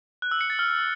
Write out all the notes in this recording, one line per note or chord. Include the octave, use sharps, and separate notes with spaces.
F#6
E6
C#7
A6
F6